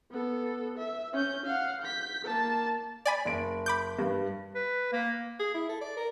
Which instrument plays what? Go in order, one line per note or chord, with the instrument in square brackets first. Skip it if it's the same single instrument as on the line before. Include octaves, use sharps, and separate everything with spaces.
[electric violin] B3 A4
E5
C#4 G6
F5 F#5
G6 B6
A#3 A5
[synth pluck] D5 G#5 B5
[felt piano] F#1 D7
[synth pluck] B5 D6 G6
[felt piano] G2
[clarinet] B4
A#3
[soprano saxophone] G#4
E4
A4
D5
A#4